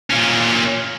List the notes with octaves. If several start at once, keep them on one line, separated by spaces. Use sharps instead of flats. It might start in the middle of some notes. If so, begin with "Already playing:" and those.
A#2 C#4